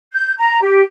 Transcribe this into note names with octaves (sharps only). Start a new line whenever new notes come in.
G6
A#5
G4